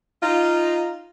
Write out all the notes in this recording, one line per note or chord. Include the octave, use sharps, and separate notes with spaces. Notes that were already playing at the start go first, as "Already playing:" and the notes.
D#4 F4